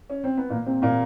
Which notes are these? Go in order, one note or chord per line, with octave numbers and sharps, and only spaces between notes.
C#4
C4
B3
A#2 A#3
C3 C4
A#2 A#3